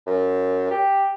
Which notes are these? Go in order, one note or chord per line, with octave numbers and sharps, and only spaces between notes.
F#2
G4